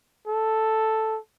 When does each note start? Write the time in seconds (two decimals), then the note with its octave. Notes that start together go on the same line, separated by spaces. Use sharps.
0.28 A4